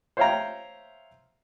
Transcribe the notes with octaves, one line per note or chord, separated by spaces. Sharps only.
C5 C#5 E5 F5 G5 A#5